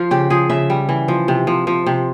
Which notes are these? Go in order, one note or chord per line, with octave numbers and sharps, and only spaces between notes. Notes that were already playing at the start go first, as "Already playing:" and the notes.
Already playing: F3 F4
C#3 G4
F3 G#4
C#3 E5
G3
E3
F3
C3
F3
F3
C3